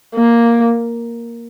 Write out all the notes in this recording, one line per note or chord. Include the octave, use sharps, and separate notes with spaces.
A#3